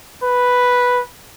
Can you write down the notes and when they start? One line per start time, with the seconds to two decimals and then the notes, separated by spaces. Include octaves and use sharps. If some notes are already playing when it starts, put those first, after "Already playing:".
0.23 B4